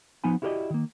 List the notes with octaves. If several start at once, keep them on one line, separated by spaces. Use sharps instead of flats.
F3 B3 D#4 G#5 B5
E4 F#4 G4 A#4 D5 D#5
D#3 A#3